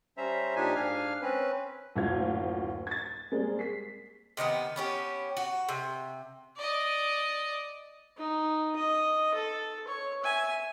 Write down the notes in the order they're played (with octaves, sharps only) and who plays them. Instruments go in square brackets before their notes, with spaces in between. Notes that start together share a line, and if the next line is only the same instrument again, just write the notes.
[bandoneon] G3 C#4 C5 E5 A#5
A#2 F3 D4 D#4 G4 G#5
G#2 D4 F5 G#5 F6
C4 C#4 B4
[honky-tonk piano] F#1 D2 A2 F4 F5 G#6
G#6 A6
G3 G#3 A#3 C4 G#4
B6 C7
[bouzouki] C3 D#3 A3 B3
B3 C#4 G4
F#4
C3
[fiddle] D5 D#5
[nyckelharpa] D#4
D#5
A4
C#5
E5 G#5